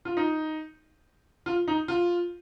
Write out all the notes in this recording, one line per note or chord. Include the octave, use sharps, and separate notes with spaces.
F4
D#4
F4
D#4
F4